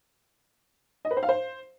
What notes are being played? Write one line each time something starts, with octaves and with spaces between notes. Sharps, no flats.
D#5
B4
C5
F5
C5